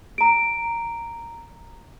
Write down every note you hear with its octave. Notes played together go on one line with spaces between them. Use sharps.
A#5 D7